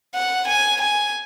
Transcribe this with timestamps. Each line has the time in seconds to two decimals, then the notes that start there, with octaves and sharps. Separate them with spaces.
0.15 F#5
0.48 G#5
0.81 G#5